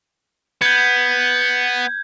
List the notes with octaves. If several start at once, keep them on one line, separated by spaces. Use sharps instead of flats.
B3 G6 G#6